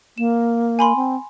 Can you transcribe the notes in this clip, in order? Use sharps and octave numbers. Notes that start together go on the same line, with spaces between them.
A#3 E7
G#5 B5 C6
C4